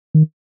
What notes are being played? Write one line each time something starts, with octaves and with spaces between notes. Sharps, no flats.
D#3